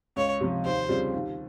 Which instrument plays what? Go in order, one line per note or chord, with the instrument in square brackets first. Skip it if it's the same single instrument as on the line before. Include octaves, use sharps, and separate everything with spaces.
[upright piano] C#2 [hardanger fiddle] C#5
[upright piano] C3 F3
[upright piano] D#2 [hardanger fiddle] C5
[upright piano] C#3 G3 C4 F4
D#2